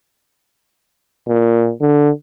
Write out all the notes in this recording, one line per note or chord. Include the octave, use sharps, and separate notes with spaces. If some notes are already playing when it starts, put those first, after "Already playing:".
A#2
D3